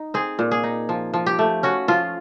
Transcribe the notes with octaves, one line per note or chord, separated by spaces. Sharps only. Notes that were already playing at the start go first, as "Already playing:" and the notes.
Already playing: D#4
C4 G#4
A#2
G#4
D#4
F3
F3
G4
A3
C#4 F#4
F3 F4